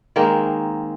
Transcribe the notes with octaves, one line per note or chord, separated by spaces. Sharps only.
D#3 G#3 A#3 C4